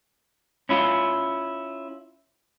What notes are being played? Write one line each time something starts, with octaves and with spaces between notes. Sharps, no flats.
C#4 E4 F4